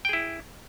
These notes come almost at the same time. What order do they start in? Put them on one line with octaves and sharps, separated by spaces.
G5 G#4 E4